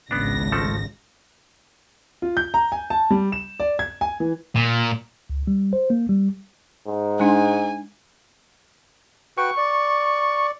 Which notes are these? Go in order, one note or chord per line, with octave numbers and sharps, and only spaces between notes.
G#1 C#2 B3 D4 A#6
F3 A3 A4
F4
G6
A#5
G#5
A5
G3
E7
D5
G#6
G#5
E3
A#2
C#2
G3
C5
A#3
G3
G#2
G#3 D4 D#4 G#5
F#4 B4 G5 C#6
D5